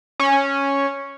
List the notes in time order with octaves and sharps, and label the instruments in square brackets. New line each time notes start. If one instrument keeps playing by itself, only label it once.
[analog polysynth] C#4